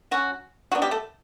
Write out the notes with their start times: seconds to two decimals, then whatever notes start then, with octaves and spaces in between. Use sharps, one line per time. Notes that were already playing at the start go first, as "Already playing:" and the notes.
0.11 F#3 C#4 F#4
0.72 C#3 F#3 B3 D4 F#4
0.82 G3 G4
0.91 A3 A4